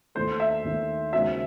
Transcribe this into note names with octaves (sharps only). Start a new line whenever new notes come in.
D#2 D#3 A3 C5
E5
D#2 D#3 A3
D#2 C#3 G#3 C4 F#4 E5